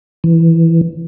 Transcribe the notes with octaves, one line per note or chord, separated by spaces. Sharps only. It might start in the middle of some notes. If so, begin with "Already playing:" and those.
E3